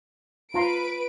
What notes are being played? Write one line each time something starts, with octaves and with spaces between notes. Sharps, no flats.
F4 B4 A#5 C6 D7